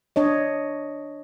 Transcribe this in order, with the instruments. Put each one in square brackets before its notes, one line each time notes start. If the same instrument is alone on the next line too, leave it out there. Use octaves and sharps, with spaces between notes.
[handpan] D4 C#5 D#5